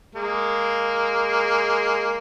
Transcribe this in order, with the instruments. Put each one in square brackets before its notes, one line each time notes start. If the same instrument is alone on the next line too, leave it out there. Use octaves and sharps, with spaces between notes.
[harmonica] G#3 A#3